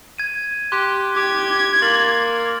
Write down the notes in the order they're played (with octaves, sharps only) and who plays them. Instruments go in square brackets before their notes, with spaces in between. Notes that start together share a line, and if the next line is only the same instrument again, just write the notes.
[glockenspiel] G#6 D#7
[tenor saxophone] G4 [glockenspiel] C6 F#6
[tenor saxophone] G4 [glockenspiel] D6 [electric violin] G#6
[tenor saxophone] A#3 [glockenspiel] C6 A6 F#7